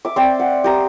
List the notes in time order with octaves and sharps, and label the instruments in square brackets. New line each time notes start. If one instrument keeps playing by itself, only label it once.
[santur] E5 D6
C4 D5 G5
F#5
G4 A#5 D#6